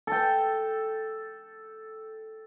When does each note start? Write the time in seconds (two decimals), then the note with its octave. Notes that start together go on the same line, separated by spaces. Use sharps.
0.07 A4 G5